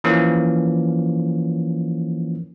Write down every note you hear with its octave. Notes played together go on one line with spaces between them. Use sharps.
E3 F3 A#3 C#4